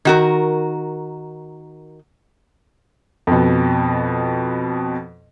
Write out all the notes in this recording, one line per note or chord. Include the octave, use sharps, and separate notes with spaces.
D#3 F#4 A#4
F2 B2